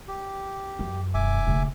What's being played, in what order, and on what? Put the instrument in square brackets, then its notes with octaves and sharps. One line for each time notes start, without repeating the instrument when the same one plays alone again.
[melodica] G4
[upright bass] F#2
[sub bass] E1 [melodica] E5 G#5 D6
[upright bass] C#3 A3